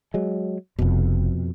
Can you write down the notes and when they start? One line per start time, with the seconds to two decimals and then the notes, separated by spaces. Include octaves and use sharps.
0.14 F#3 G#3
0.79 F1 F2 B2